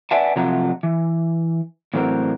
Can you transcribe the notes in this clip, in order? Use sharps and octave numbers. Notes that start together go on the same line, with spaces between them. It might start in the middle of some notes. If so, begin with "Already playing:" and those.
B4 D5 E5 F#5 G#5 A5
C3 F3 F#3 A3 F4 A#5
E3
A2 E3 F#3 A3 C4 A#4